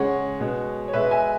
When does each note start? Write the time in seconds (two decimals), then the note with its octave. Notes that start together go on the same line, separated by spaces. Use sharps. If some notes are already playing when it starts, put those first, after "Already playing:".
Already playing: C#3 G#3 C#5 F#5
0.40 B2 G#3
0.88 C#5
0.93 B2 G#3 B4 E5
1.11 E5 G#5